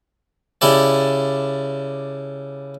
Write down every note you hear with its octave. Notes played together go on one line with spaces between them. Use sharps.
C#3 E4 G4 D5 A5